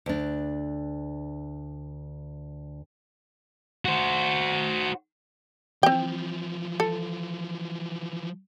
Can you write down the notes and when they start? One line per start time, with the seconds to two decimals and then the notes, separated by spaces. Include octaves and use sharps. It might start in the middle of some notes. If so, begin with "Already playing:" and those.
0.06 D2 D4
3.85 F#4 C5
5.83 E3 F3 C4 G5
6.80 A4